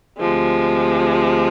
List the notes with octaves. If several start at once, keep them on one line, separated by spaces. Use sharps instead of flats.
D2 C3 F3 G#3